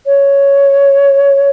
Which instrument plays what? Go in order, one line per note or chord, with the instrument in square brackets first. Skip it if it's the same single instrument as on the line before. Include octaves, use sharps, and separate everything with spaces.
[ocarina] C#5